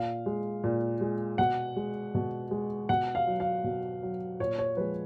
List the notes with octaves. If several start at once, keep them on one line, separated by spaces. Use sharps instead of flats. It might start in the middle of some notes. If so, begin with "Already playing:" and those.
Already playing: A#2 F5
G#3
A#2
G#3
B2 F#5
G#3
B2
G#3
B2 F#5
F5
F#3
F5
B2
F#3
A#2 C#5
C#5
F3 G#3 B4